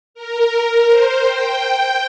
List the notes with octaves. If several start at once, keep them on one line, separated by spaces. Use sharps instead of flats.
A#4
C5
G5